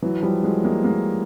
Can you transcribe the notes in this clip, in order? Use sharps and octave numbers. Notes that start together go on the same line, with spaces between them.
E3 F#3
F3 G3
F#3 G#3
G#3 A#3
G#3 A#3